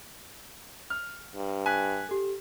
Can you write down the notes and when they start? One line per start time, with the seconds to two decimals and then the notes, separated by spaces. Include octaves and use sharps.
0.90 F6
1.36 G2
1.66 G#5 F#6 B6 F#7
2.09 G4 A4